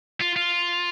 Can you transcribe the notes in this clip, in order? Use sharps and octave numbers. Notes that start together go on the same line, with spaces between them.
F4
F4